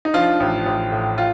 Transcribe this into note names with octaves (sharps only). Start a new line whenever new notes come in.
D#4
F3 D4 F4
A1
A1
A2
F4